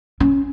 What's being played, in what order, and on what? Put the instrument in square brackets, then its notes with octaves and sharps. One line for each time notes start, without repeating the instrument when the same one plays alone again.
[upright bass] C#4